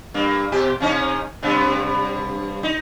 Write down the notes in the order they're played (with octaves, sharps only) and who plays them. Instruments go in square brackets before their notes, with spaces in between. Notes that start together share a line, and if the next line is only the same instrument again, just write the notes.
[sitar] G2 A#3
B2 G4
C3 C#4 D#4
G2 C3 B3
D#4